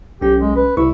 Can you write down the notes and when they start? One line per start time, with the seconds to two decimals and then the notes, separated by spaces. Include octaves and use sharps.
0.21 B1 C#4 G4
0.40 G#3
0.56 B4
0.77 C2 E4 C#6